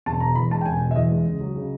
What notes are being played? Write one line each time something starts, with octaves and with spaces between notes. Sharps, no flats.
E1 A5
B2 A#5
E2 B5
G#3 A5
G5
E1 G#5
B2
E5
E2 D#5
G#3
C#2
F#3
C#3